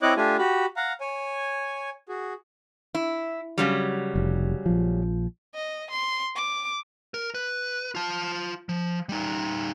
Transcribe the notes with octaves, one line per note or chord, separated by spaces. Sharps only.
C4 E4 C#5 D#5 D6 F#6
A3 D4 F4 G4 G#5
F#4 G4 B5
F5 F#5 A#5
C#5 G#5
F#4 G#4
E4
C#3 F#3 G3
F1
A#1 F3
D#5
C6
D6
A#4
B4
F4 A5
F3
G3 D#4